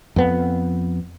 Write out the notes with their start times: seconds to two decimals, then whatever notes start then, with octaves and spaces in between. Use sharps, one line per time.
0.16 F2 B3